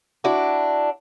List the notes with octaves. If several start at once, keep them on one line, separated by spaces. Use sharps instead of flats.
D4 E4 F#4